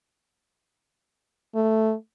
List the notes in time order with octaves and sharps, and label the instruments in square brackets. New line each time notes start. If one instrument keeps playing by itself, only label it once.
[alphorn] A3